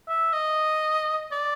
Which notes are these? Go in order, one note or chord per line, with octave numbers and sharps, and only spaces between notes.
E5
D#5
D5